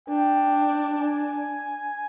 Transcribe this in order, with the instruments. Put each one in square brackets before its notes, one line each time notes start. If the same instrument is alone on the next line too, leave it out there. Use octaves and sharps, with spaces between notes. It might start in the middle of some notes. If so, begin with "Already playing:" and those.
[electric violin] D4 [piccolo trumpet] G5
[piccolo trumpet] G#5